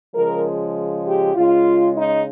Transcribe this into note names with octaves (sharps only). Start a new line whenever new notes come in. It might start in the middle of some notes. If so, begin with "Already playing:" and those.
C#3 F3 G#3 A#4
G4
C#3 G#3 F4
D#4